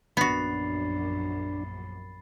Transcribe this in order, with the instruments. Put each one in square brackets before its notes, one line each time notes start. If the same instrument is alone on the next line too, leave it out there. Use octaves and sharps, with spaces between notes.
[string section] A#1 F#2 [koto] B3 F#4 [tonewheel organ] D4 [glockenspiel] B5 A6 C7